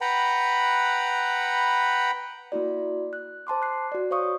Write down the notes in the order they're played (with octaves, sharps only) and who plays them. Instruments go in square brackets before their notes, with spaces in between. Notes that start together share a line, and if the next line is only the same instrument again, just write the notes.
[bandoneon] B4 F#5 G5 A#5 B5
[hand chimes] A#3 E4 F#4 D5
F#6
C5 A5 C6 D6
F#6 C7
F#4 D5
C5 C#5 F5 C#6 D#6